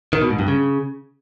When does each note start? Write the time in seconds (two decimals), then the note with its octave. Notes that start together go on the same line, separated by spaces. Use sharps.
0.13 D#3
0.22 B2
0.30 G#2
0.39 G2
0.48 C#3